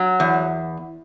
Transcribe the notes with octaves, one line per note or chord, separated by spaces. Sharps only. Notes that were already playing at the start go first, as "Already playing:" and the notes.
Already playing: F#3
E2